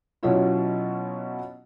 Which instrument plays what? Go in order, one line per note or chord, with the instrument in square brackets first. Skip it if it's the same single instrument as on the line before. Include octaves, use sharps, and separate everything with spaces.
[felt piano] B2 F#3 B3 C#4 E4 F4